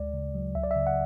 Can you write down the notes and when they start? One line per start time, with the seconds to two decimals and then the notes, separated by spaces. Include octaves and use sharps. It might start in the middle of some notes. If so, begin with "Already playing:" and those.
Already playing: D2 G#3 D5
0.14 C#3
0.35 F#3
0.55 C#2 E5
0.63 D5
0.71 E5
0.76 C#3
0.87 F#5